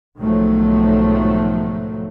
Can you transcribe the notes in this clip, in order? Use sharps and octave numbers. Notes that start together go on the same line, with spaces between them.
B1 G#2 D#3 F3 F#3 A3